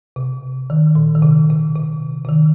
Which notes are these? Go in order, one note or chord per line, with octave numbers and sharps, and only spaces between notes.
C3
D#3
A#2
D#3
C3
C3
C3
C3
D#3